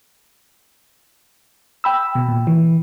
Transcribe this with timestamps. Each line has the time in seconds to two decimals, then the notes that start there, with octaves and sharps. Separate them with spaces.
1.84 G5 B5 E6
2.15 B2
2.28 A#2
2.47 E3